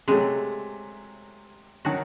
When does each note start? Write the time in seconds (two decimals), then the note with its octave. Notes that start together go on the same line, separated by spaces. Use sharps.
0.08 C3 F#3 G#3 A3
1.85 D#3 F#3 F#4